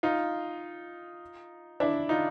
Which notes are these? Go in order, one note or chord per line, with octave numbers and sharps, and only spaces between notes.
D#4 F4
D4 E4
D#4 F4